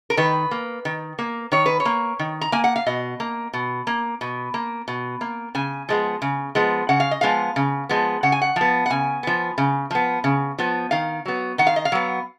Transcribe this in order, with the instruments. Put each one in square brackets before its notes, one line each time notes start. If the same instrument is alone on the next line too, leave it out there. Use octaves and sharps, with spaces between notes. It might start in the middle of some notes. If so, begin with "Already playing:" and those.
[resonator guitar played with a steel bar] A#4
D#3 B4
A#3
D#3
A#3
D#3 C#5
B4
C#5
A#3
D#3
A#5
A#3 G#5
F#5
F5
B2 D#5
A#3
B2
A#3
B2
A#3
B2
A#3
C#3 G#5
F3 G#3 B3
C#3
F3 G#3 B3
C#3 F#5
F5
D#5
F3 G#3 B3 F5
C#3
F3 G#3 B3
C#3 F#5
G#5
F#5
F3 B3
F#5
C#3 G#5
F3 B3
C#3
F3 B3
C#3
F3 B3
D#3 F5
F#3 B3
D#3 F#5
F5
D#5
F5
F#3 B3